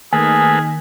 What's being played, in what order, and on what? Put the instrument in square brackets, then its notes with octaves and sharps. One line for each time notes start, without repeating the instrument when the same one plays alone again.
[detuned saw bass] D#3 [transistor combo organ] A3 A#3 B4 [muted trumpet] G#4 [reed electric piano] G#5